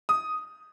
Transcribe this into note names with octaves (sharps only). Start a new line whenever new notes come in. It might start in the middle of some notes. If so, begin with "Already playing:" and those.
D#6